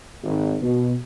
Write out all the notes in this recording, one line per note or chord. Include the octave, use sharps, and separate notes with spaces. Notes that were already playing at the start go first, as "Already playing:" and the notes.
G#1
B2